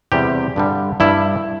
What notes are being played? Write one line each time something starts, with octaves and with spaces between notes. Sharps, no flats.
E2 C3 G3 G4
G2 D3 G3
G2 G3 E4